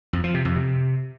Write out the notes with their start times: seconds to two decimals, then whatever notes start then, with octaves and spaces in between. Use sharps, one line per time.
0.13 F2
0.24 F3
0.34 C3
0.45 F2
0.56 C3